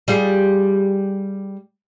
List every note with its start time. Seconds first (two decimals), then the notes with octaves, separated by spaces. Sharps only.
0.08 G3 F4 G#4